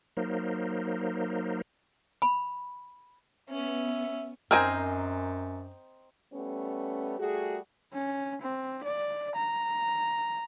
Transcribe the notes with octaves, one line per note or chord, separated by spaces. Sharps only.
F#3 A#3 D#4 A#4 C5
B5
B3 C#4 E5
F#2 C4 D#4 A#4 C5 G#5
G3 A3 B3 C#4
G3 A3 F#4 G#4
C#4
C4
D5
A#5